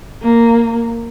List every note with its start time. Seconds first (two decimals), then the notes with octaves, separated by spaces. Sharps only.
0.22 A#3